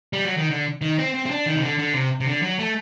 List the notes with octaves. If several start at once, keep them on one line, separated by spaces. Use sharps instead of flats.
G3
F#3
D#3
D3
D#3
C4
C4
C4
D4
D#3
C3
D3
D3
C3
C3
D3
F#3
A3